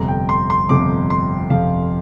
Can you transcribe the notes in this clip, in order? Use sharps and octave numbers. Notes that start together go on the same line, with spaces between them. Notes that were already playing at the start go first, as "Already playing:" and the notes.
Already playing: G1 F2 C3 F3 A#5
G5
C6
C6
G1 F2 C3 F3 D6
C6
G1 F2 C3 F3 F5